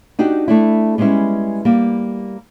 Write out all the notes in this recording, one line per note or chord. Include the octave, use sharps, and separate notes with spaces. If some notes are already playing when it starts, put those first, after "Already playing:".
D4 D#4 F#4 G4
A3 D4 E4
G3 G#3 B3 C#4 E4
G3 A#3